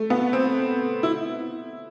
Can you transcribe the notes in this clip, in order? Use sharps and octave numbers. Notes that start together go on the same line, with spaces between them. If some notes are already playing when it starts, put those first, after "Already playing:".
Already playing: A3
B3
C4
E4